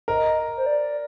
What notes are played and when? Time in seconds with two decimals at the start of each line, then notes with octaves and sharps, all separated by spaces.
0.08 A#4 D#5
0.57 C5
0.66 D5